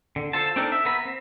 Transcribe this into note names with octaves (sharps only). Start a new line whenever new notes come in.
D3
F4 A4 C5 A5
C4 D4 D#4 A4 A#4
E5
B3 A#4 B5
C4